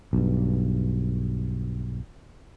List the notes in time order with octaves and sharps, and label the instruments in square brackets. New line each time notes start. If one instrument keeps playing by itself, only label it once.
[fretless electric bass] B1 G2